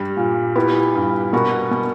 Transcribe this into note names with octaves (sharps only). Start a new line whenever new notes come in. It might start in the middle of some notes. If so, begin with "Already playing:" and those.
Already playing: G2 G3
A#2
B3 E4 G4
G2
B2 F#4 A#4
B2